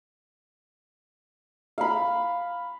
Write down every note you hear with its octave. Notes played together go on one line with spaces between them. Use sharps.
F5 B5